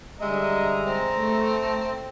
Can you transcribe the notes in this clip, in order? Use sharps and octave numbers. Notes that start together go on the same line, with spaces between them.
D3 G3 G#3 D#5 E5 A#5
C4
A3